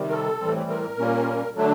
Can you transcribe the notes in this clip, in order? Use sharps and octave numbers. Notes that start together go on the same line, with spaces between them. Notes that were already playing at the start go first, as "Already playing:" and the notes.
Already playing: C3 D#3 G3
A#4
A4
A2 E3 G3 C4
A#4
A#2 G3 A#3 C#4
D3 F#3 A3 D4